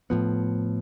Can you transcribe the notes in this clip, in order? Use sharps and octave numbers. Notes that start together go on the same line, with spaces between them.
A2 F3 B3